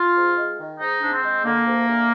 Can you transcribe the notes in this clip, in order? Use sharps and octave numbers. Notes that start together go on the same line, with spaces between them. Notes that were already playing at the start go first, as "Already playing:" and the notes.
Already playing: F4
G#2
G#3
D#3
G#2 D#4
G#2 D4
C4
G#3
D3 A#3
D2
D2